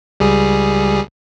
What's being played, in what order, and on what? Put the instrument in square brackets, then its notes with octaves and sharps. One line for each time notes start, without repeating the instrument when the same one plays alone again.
[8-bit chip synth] C#2 G3 G#4